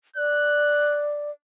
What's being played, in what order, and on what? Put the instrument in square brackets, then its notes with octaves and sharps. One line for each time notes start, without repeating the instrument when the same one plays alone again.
[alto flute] D5 [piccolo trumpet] F#6